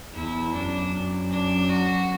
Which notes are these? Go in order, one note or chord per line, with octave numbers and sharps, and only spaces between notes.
E2 E4
F#2 D4
F#2
D4
F#4